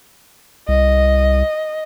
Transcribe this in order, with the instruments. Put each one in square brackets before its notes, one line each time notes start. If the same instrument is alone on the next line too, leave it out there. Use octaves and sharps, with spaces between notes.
[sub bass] C2 [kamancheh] D#5